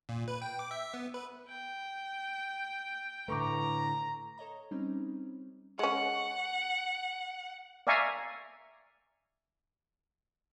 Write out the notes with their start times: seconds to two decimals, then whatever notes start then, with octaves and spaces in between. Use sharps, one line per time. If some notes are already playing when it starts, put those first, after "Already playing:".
0.09 A#2
0.28 B4
0.42 G5
0.59 D6
0.71 E5
0.94 B3
1.14 B4
1.49 G5
3.28 A2 D3 A3 B4 A#5 C#6 D6
4.38 A4 C#5 D#5 A#5
4.71 G3 C4 C#4 D#4
5.79 G#3 C#4 F#5
7.87 D5 E5 F5 G#5 A#5 C#6